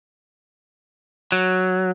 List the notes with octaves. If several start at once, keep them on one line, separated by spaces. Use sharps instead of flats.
F#3